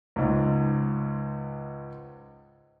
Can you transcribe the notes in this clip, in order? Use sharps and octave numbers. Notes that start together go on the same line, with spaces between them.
C#2 G#2